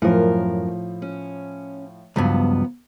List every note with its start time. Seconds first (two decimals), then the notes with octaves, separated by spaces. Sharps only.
0.02 F#2 A2 F3 A#4
1.02 C#4
2.16 C#2 G2 F3 F#3 B3